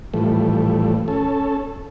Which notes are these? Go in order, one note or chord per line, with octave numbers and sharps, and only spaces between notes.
A2 E3 F3 G3 A3
C#4 A4